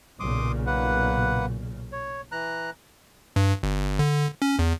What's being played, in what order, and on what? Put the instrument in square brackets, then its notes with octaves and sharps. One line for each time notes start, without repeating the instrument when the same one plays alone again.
[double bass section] B1 A#2 C#3 [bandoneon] C6 D6 D#6
[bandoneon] A#3 B4 F#5
C#5
E3 A#5 F#6
[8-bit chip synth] G2
G1
D3
C#4
E2